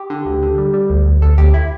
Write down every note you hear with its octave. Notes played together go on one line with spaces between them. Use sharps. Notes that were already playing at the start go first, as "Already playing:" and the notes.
Already playing: G4
D3
D2
D3
G3
G3
D2
D2
D2 A4
D2 G4
E4